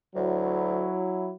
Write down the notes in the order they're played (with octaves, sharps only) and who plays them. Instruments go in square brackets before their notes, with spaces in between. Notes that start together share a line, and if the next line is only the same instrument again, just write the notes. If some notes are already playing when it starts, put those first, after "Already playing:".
[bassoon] D2 [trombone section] F#3 E4